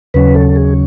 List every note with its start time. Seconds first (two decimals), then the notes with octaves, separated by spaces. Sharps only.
0.14 D#2 C#3 F#3 C#4 B4
0.35 A4
0.56 G#4